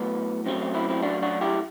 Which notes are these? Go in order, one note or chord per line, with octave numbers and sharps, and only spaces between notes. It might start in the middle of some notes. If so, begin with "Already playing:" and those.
Already playing: A2 F#3 A3 B3
F#2 F#3 A3 C4
C4
C4 E4
C4 E4
D4 F#4
D4 F#4
E4 G4